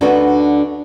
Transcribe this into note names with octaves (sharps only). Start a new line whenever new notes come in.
D2 D3 D4 D#4 F#4 B4